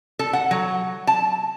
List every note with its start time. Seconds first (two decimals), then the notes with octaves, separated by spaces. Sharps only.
0.19 A4
0.33 F#5
0.51 F#3
1.07 A5